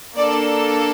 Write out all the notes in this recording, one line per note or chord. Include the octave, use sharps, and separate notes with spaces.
A#3 D4 A4 D5